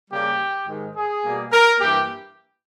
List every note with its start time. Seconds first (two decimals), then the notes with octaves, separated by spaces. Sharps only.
0.11 C#3 G3 A#3 G4
0.66 G#2 D#3 G#3
0.95 G#4
1.23 B2 G3 A#3
1.52 A#4
1.80 G2 E3 A#3 G4